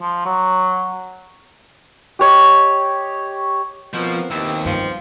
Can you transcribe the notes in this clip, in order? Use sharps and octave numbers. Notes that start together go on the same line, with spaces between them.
F3
F#3
G4 C#5 D#5
B2 F3 B3 C4 A#4
D#2 B2 D#3 C4 E4
G2 F3